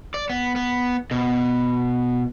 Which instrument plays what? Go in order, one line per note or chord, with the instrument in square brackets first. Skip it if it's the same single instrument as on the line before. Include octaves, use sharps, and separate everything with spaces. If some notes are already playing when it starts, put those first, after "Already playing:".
[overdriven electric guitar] D5
B3
B3
B2